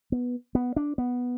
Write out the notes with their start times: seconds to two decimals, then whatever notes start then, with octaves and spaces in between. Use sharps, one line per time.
0.12 B3
0.55 B3
0.76 D4
0.98 B3